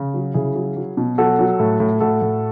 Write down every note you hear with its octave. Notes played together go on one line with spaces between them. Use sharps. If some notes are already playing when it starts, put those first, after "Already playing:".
Already playing: C#3
F#3
C#3 E4 G#4
F#3
F#3
B2
F#3 F#4 A4
F#3
A2
A2
A2 F#4 A4
A2